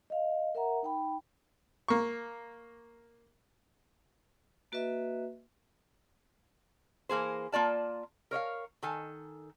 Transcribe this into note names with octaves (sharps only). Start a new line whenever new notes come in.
D#5 F5
A#4 E5 F#5 A#5
D#4 G5 B5
A#3 C#6
A#3 F#4 B4 D#5 E5
E3 A#3 G#4 C5
A#3 F4 D5 A5
A#4 C#5 D#5 F5
D#3 A4 G#5